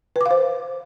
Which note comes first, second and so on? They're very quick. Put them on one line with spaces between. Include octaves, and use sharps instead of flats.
B4 D6 F5 C5